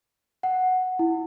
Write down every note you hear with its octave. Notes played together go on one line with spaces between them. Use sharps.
F#5
E4